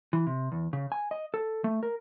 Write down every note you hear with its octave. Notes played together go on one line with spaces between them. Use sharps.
E3
C3
E2
C#3
G#5
D#5
A4
A3
A#4